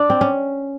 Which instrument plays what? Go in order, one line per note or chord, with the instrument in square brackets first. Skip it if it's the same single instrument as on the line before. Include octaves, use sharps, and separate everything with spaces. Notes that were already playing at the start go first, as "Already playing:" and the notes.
Already playing: [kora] D4 [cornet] D5
[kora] C4
C#4